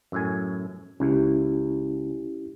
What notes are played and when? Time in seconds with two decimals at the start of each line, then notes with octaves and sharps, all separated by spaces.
0.12 F#2 A2 G#5
1.00 C#2 C#4 E4 G4